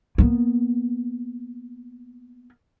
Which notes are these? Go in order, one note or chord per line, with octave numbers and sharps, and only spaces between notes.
A#3 B3